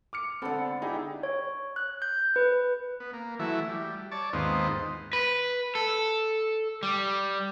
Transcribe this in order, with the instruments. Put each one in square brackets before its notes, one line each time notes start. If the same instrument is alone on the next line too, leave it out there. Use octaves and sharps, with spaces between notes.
[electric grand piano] D6 F6 C#7
[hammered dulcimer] D3 B3 [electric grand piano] C4 A4
[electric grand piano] D#4 G#4 [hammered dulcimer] E4 G4
[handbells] C#5
F#6
G6
B4
[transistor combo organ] B3
A#3
E3 F#3 A3 E4
G3
C#5 D5 A5
D#2 G#2 B3 C4 D#4 F4
[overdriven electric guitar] B4
A4
G3